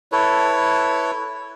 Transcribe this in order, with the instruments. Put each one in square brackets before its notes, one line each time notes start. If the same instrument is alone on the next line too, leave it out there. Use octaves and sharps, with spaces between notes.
[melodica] E4 A4 B4 C#5